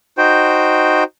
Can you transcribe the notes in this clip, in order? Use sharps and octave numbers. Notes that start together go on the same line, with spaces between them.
D#4 F#4 C5 G5